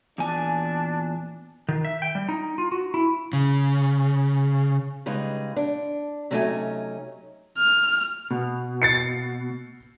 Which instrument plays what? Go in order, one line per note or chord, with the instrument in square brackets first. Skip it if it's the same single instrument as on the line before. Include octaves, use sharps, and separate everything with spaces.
[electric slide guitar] E2 A#2 G#5 [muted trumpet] D4
[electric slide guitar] D#3
E5
G5
G3
D#4
F4
F#4
E4
C#3
[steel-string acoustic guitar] C#3 G3 G#3 D#4 G#4 B4
D4
C3 F#3 A3 C#4 D#4 G#5
[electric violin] F6
[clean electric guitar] B2
[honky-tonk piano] A6 C7 C#7